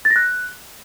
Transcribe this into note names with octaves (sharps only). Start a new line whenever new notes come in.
A6
A#6
F#6